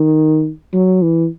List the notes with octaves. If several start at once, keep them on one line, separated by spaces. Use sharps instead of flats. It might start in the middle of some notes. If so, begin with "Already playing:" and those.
Already playing: D#3
F#3
E3